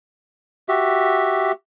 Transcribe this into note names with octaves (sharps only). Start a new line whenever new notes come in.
F#4 G4 E5